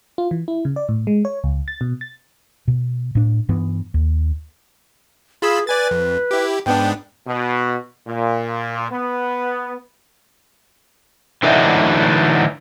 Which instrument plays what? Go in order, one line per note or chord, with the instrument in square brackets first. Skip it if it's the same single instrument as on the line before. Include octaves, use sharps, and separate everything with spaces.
[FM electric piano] F4
E3
E4
C#3
D5
A2
G#3
C#5
C#2
A6
B2
A6
[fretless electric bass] B2
A2 D4
G2 E3 B3
D#2
[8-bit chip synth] F4 B5 E6 [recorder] G#4
[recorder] B4 [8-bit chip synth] D5 G#5 A6
[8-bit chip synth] F2
E4 G4
[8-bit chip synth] G#2 B3 D4 [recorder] G5
[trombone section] B2
A#2
B3
[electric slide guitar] D3 E3 F#3 A3 D#4